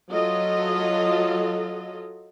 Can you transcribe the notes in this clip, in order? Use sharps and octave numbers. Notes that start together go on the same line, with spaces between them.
F#3 F4 A4 D#5